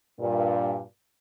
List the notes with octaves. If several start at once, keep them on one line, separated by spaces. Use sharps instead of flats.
G2 A#2